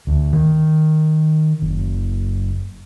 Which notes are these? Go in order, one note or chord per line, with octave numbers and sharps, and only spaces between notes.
D2
D#3
F#1